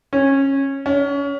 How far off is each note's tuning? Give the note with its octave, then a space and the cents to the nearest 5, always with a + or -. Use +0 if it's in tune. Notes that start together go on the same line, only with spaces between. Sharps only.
C#4 -20
C#4 +25